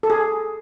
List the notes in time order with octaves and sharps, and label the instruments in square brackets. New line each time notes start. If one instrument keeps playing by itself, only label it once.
[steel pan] A4
G#4